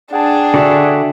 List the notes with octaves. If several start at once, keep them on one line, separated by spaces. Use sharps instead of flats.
D4 G#4 F#5 G5 A5
D3 F#4 E5